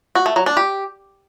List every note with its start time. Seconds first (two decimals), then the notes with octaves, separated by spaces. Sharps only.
0.15 F#4
0.26 A3
0.36 F#3
0.46 D4
0.57 G4